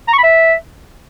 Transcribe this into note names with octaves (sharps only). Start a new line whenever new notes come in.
A#5
C#6
B5
E5